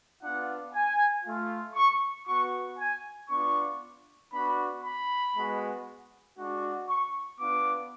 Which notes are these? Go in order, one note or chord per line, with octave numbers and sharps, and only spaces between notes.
B3 D4 F4 F#5
G#5
A3 F4
C#6
B3 F#4 C#6
G#5
B3 D4 F4 C#6
B3 D4 F#4 B5
B5
G#3 B3 F#4
G#3 D4 F#4
C#6
B3 D4 F4 D6